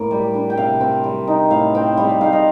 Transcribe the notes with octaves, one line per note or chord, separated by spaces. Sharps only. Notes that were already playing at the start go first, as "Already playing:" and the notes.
Already playing: A2 A#3
G3
D4
G5
C3 F5
C4
G3
D#4
A2 F5
C4 G5
G3 F5
F5
D#4 F5
D#5